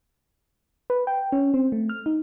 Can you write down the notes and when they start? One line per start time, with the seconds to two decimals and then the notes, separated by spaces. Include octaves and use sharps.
0.90 B4
1.07 G5
1.32 C#4
1.54 C4
1.72 A3
1.89 F6
2.06 D#4